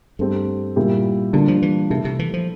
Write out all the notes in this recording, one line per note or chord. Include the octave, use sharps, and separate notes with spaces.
G2 A3 C4 G4
A#2 G3 A#3 E4 G4
D3 G3 A#3 D4 F4
F3
E3
C3 E3 A3 E4 A4 E5
C3
E3
F3